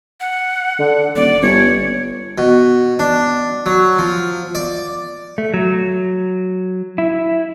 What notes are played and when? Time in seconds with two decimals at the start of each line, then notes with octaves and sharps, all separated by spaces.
0.20 F#5
0.79 D3
1.16 D#1 D5
1.42 G1 C#5
2.38 B2
2.99 D4
3.66 F#3
3.99 F3
4.55 D5
5.38 A3
5.54 F#3
6.98 E4